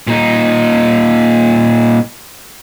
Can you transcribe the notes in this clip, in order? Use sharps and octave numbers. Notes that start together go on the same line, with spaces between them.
A#2 D#4